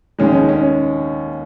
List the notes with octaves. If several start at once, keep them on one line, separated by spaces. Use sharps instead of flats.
D#2 D#3 G#3 C#4
C#4